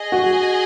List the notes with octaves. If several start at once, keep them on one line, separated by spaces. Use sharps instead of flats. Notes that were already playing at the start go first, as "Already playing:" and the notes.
Already playing: G#4 D#5 G#5
F#4